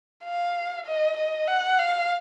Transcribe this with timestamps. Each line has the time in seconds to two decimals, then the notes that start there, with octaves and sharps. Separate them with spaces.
0.24 F5
0.86 D#5
1.17 D#5
1.48 F#5
1.79 F5